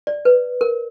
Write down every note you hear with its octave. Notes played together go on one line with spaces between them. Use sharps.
D5
B4
A#4